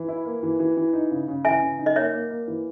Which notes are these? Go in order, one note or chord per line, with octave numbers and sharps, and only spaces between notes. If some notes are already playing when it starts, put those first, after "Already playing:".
Already playing: E3
E4
A#3
E3
E3
E3
D#4
C#3
C#3
E3 E5 G#5
C#3
D#4
D#5
A#3 C#5 E5
A#3
A#3
E3